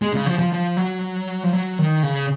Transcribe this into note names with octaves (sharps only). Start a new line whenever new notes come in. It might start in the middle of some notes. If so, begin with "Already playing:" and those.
G#3
C#3
F3
F3
F3
F#3
F3
F#3
D#3
C#3